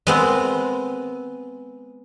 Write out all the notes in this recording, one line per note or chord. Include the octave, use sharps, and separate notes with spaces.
G#3 B3 C4